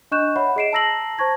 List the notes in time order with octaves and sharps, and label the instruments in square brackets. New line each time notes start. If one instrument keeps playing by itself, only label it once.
[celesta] D4 D#5 C#6 F#6 G6 E7
C#5 E5 F#5 B5
G#4 D#5 C7 D7 E7
A5 A#5 E6 A#6 C7 F#7
C5 A5 C#6 G#6 A#6